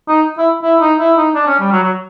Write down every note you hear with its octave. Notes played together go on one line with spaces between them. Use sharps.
D#4
E4
E4
D#4
E4
D#4
D4
C#4
G3
F#3
F#3